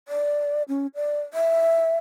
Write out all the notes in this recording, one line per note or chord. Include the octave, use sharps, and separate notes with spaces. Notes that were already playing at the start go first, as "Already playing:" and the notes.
D5
C#4
D5
E5